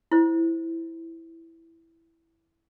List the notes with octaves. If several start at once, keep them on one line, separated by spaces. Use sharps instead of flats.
E4 C5